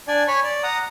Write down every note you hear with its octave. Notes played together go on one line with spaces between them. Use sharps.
D4 D5 G#5
C#5 G#5 B5 C#6
D5
F#5 A#5 D#6